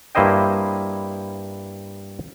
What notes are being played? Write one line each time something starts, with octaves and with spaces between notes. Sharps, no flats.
G2 A#3 E4 C5 D#5 G5